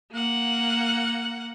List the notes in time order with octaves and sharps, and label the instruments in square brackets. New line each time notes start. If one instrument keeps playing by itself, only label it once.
[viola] A#3 F#5